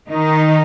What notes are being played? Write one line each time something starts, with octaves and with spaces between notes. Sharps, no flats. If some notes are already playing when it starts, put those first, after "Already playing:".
D#3 D#4